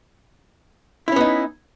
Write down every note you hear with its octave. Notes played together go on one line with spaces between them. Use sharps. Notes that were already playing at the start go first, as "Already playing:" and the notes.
B3 C#4 D#4 E4